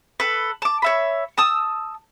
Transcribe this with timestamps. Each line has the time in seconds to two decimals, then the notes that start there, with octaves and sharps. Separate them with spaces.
0.20 A4 B4
0.62 A5 D6
0.82 C#5 E5 B5
1.38 A5 D#6 E6